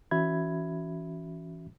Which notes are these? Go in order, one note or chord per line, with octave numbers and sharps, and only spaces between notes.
E3 C#4 F#4 E5 B5 G#6